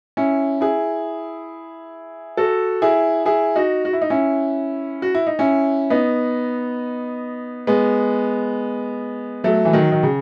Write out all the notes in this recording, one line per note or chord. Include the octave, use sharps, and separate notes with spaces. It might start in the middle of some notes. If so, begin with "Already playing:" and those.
C#4 E4
E4 G#4
F#4 A4
E4 G#4
E4 G#4
D#4 F#4
F#4
E4
D#4
C#4 E4
F#4
E4
D#4
C#4 E4
B3 D#4
G#3 B3
F#3 A3
E3
D#3 F#3
D#3
C#3